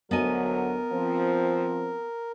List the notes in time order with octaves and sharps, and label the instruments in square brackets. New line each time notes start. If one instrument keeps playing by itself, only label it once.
[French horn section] D2 F#3 [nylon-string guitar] B3 D#5 G#5 [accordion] A#4
[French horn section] F3 C4